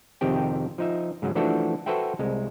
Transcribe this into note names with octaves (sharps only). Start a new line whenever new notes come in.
F2 C3 D#3 C4 G4 G5
F3 D#4 E5
G#2 C#3 F#3
E3 F3 A3 D4 F#4 A4
F#4 A4 B4 C5 E5 G5
C2 G#3